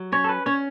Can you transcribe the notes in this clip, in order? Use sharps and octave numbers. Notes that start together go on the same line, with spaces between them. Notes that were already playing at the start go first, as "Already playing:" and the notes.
Already playing: F#3
C#4 C#5
A4
B4
C#4 C#5